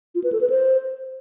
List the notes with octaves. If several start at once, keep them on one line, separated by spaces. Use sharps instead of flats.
F4
B4
A4
B4
C5